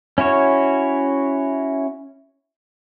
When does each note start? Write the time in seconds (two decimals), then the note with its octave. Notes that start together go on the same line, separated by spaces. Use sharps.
0.18 C#4 E4 F#4 C#5